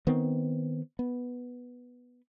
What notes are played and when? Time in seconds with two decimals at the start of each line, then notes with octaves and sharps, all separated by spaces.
0.07 D#3 B3 C4
0.99 B3